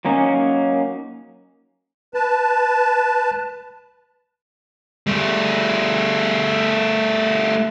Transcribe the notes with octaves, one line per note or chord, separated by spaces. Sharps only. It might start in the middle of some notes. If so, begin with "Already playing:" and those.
F#3 A#3 C#4 D#4
B4 A5
G3 A3